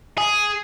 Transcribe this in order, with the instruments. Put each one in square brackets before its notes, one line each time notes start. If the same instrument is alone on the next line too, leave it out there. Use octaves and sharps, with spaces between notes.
[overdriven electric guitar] G#4